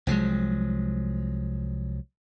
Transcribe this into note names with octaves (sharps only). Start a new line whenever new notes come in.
C2 F3 F#3 G#3